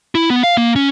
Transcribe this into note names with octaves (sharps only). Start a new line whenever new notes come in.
E4
B3
F5
A#3
C#4